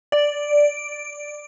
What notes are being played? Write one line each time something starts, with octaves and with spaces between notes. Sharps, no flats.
D5